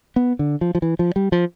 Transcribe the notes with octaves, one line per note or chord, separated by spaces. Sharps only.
B3
D3
F3
F3
E3
F3
G3
F3